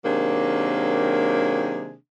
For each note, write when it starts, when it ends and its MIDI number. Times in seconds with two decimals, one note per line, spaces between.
0.04 1.94 48
0.04 1.94 51
0.04 1.94 54
0.04 1.94 58
0.04 1.94 62
0.04 1.94 68